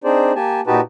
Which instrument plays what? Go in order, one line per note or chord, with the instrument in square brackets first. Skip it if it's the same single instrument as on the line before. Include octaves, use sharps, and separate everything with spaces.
[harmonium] C4 D4 D#4 G#4 C5 D5
A#3 G4 G#5 A5
A#2 D#4 F#4 G4 B4 A5